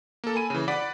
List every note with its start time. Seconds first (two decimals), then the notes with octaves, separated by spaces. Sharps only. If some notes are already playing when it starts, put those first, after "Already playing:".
0.24 A#3 A4
0.36 G#5 B5 D#7
0.50 C#3 E3
0.68 D5 F#5 B5 D6 B6